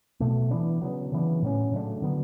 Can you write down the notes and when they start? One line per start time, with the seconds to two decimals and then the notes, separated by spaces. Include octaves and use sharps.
0.20 B2 F#3 A3
0.51 E3 B3 D4
0.81 C#3 F#3 B3
1.12 C#3 E3 B3 D4
1.43 A2 F#3 C#4
1.72 C#3 F#3 A3 D4
2.02 D3 F#3 B3